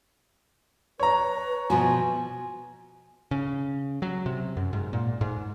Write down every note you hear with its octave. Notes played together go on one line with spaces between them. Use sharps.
B4 C#5 A#5
B2 F3 F#4 G#5
C#3
F#3
C3
F#2
G#2
A#2
G#2